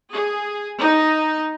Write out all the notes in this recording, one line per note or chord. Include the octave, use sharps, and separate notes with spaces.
G#4
D#4